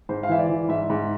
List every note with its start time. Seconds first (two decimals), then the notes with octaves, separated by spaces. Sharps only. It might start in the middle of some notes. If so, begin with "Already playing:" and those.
0.09 G#2 C5
0.23 F5
0.29 E3 E5
0.39 D5
0.49 E3
0.69 G#2 E5
0.90 G#2